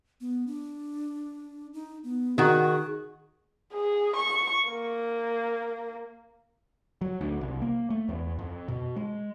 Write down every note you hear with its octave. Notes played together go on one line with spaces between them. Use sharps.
B3
D4
D#4
B3
D#3 F#4 G#4
G#4
C#6
A#3
F#3
D2
C2
A#3
A3
E2
F2
B2
G#3